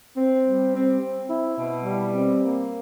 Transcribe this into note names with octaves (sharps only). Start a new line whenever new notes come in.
C4
G3
C4
C4
E4
B2
G3
C4
A#3